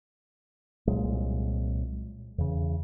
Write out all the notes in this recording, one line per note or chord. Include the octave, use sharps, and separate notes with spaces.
C2 A#2 F#3 G#3
E2 C#3